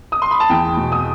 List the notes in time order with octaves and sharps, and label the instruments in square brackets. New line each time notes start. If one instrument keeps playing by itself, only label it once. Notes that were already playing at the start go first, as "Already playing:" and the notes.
[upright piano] D#6
C6
B5
A5
E2 G5
B2
D#6